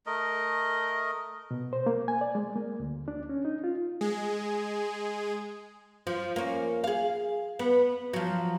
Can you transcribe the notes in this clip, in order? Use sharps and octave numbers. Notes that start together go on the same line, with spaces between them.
A3 A#4 D#5
B2
C5
A#3
G#5
D5
G#3
A#3
D2
D4
C#4
D#4
F4
G#3 G#4
F3
A#3 C#4
G#4 F5
B3
F3 F#3